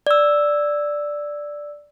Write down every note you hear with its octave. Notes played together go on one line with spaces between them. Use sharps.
D5 E6